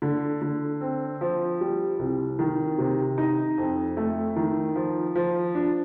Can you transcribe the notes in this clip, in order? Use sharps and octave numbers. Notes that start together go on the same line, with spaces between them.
D3
D3
C4
F3
G3
C2
D#3
C3
D#4
F2
A3
D#3
F3
F3
D4